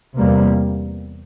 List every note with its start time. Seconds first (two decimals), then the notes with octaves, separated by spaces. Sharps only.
0.17 E2 C3 G3 A#3